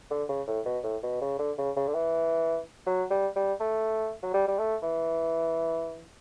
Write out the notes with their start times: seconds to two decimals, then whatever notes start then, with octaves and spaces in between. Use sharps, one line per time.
0.11 D3
0.29 C#3
0.47 A2
0.65 B2
0.84 A2
1.03 B2
1.21 C#3
1.39 D3
1.58 C#3
1.76 C#3
1.87 D3
1.94 E3
2.86 F#3
3.10 G3
3.36 G3
3.60 A3
4.23 F#3
4.34 G3
4.48 G3
4.58 A3
4.82 E3